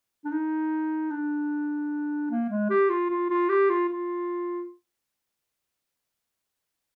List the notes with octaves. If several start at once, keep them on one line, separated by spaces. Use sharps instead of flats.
D4
D#4
D4
A#3
G#3
G4
F4
F4
F4
G4
F4
F4